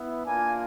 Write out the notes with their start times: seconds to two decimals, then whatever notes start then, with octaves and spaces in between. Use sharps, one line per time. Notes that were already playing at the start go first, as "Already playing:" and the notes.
Already playing: B3 E4
0.25 A#3 D4 F4 G#5